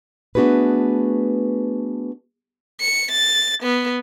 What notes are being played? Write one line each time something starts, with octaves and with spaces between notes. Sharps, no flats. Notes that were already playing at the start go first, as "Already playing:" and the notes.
A3 B3 D4 F#4 G#4 B4
C#7
A6
B3